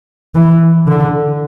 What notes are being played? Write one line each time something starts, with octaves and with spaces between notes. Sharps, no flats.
E3
D3